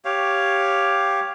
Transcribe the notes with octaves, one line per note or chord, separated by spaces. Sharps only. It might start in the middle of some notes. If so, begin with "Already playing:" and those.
G4 C#5 F5